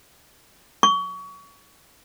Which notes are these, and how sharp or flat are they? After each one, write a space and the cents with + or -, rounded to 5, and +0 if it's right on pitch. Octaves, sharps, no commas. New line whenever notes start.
C#6 +30